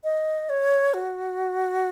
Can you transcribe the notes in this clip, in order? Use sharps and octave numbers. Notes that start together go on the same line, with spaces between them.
D#5
C#5
F#4